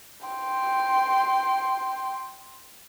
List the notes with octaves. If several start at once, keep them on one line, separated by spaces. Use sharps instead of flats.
G5 C6